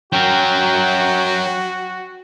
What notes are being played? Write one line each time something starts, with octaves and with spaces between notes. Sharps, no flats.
F#3 F#4 A#4 G5